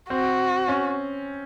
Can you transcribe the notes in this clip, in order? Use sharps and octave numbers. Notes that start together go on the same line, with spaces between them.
C4 F#4
C#4